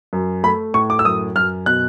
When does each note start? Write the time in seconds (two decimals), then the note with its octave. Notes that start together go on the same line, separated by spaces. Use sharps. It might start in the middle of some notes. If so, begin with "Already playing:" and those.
0.13 F#2
0.44 A3 B5
0.74 A2 C#6
0.90 D6
0.99 E6
1.05 F#2 D#6
1.36 F#2 F6
1.66 B2 F#6